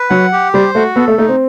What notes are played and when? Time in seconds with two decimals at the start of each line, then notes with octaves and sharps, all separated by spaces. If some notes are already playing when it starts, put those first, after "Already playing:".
Already playing: B4
0.10 F#3 F#5
0.32 G4
0.54 G3 C5
0.75 A3 F#4
0.96 B3 A4
1.08 A3
1.18 A3 D#4
1.29 C4